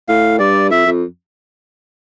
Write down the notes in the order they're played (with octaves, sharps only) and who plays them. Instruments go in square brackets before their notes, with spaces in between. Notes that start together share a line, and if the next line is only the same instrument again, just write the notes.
[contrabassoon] A2 [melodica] F5
[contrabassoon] G2 [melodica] D5
[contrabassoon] F2 [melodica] E5
[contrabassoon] F2